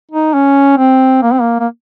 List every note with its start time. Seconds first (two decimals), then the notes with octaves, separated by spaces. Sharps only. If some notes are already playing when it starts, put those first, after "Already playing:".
0.11 D#4
0.34 C#4
0.78 C4
1.23 A#3
1.32 C4
1.41 A#3
1.60 A#3